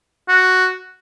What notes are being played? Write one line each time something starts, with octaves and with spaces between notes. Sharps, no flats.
F#4